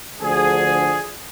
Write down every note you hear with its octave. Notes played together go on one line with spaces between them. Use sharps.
D2 D3 F3 G#4